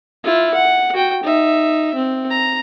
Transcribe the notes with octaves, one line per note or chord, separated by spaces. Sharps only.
E4 F4
F#5
F#4 G5
D#4 E5
C4
A#5